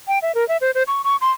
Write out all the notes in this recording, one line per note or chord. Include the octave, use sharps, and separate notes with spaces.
G5
E5
A#4
E5
C5
C5
C#6
C#6
C6